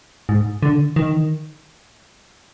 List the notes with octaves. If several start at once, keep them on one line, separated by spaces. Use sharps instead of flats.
G#2
D3
D#3